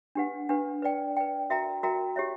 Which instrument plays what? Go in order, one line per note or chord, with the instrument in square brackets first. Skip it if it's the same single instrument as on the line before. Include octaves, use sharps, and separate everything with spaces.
[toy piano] D4 G4 B4 F#5
D4 G4 B4 F#5
B4 D5 G5
B4 D5 G5
F#4 A#4 E5 G5 A#5
F#4 A#4 E5 G5 A#5
G4 C#5 E5